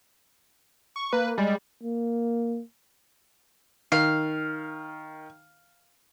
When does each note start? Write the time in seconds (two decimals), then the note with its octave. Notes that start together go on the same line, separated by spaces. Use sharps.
0.96 C#6
1.13 A#3 B4
1.38 G3 G#3
1.83 A#3
3.92 D#3 F5